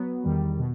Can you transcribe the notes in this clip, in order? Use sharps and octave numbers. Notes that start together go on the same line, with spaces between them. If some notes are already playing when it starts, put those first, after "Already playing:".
Already playing: F#3 B3
E2 D#3 G3
B2